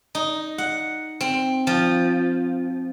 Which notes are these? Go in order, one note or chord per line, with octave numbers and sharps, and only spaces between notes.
D#4
F#5
C4
F3